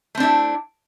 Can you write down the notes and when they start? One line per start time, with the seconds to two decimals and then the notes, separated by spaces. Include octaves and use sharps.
0.15 A3
0.17 C4
0.20 D4
0.23 E4